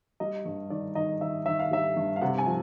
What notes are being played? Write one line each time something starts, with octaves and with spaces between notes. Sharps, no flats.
G3 D#5
G2
D#3 D5
D#3 D#5
D#3 E5
D#3 E5
F5
G3 E5
G2
F5
C3 F#5
G#5
F3